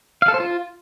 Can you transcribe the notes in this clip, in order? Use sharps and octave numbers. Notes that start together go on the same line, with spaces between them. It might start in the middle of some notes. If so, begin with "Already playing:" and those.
F5
A4
C5
F4